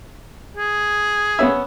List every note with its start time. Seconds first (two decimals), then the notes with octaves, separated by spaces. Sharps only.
0.57 G#4
1.39 B3 C#4 E5